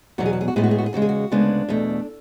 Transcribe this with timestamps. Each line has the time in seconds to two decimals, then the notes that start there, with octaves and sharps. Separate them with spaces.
0.18 E2 B2 F#3 F#4
0.26 G#4
0.33 F#4
0.41 G#4
0.48 F#4
0.56 A2 G#3 B3 G#4
0.63 F#4
0.71 G#4
0.78 F#4
0.86 G#4
0.93 E2 C#3 G#3 F#4
1.02 G#4
1.09 F#4
1.31 D2 C#3 G#3 B3 D4
1.68 E2 B2 A3